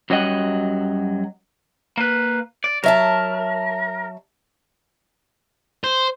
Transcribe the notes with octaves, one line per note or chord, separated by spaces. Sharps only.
F#2 F#3 G3 D#5 F#5
A#3 B4
D5
F#3 A#4 E5 A5
C5